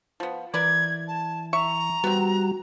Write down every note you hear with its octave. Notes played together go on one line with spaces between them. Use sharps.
F3 B3
E3 A#4 B4 D5 G#6
A5
E5 A#5 C#6
G3 B3 C4 F#4